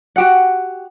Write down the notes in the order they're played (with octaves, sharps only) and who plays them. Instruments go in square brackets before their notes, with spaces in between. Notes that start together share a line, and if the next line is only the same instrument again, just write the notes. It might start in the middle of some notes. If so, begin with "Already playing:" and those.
[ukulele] F#4 G4 F#5